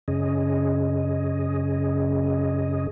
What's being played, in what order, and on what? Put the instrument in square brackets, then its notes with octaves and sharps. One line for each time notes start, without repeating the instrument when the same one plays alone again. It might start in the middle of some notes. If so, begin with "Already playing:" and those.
[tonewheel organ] F#2 C#3 C#4 G#4 D#5